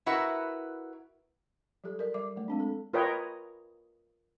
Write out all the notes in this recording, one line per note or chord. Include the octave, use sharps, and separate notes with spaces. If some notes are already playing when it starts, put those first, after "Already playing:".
E4 F#4 A#4 B4 E5 F#5
F#3 G3 G4 A4
A#4 D5
G3 D5 D6
F#3 A3
G#3 C4 D4
A4
F4 A#4 B4 C#5 D#5 G5